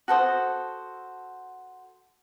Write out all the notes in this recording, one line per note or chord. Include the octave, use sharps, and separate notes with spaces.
F#4 A4 C5 D#6